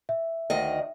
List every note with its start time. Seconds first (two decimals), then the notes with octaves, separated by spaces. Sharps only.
0.09 E5
0.50 D2 D#3 D#5